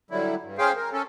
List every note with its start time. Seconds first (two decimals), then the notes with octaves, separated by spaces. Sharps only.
0.11 D3 F#3 G3 E4
0.42 G2
0.58 C#4 G#4 C5 F5 G5
0.76 A#4
0.92 C#4 A4